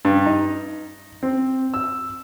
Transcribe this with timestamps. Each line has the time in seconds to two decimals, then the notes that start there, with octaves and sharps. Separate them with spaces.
0.05 G2
0.26 D#4
1.23 C4
1.74 E6